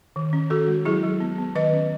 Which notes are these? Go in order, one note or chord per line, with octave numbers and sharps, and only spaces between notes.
D#3
C#4
D#3 F#4 A4
G#3
F#3 E4 G#4
F#3
B3
B3
D#3 B4 D#5
C#4